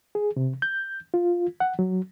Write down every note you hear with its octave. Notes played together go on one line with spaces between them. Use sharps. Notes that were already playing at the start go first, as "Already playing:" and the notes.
G#4
C3
G6
F4
F#5
F#3